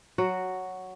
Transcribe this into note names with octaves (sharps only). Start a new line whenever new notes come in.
F#3 F#4